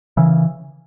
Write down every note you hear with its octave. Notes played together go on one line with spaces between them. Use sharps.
C#3 E3